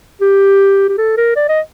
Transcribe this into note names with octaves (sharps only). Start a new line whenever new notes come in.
G4
G4
A4
A#4
D5
D#5